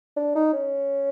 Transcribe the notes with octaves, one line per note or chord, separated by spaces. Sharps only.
D4
D#4
C#4